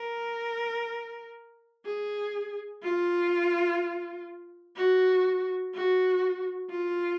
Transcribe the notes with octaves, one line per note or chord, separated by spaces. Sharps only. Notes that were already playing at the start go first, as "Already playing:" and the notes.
Already playing: A#4
G#4
F4
F#4
F#4
F4